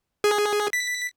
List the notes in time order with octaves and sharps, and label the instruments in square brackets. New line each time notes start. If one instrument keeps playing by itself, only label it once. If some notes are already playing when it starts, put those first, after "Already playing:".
[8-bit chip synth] G#4
B6